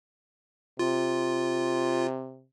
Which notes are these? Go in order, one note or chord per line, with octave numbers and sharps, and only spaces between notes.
C3 F4